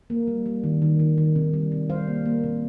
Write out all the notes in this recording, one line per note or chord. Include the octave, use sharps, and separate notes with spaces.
A#3
G3
G3
D#3
D#3
D#3
D#3
C3
G3
C3
G3 C5 F5
A#3
A#3
C3